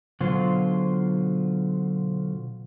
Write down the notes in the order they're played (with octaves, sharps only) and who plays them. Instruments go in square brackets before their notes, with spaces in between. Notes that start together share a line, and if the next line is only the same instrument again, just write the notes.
[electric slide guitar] B2 D3 F#3 F4 C5